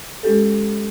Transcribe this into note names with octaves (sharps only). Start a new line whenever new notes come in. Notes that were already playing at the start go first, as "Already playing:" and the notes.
G#3 C#4 G4 A4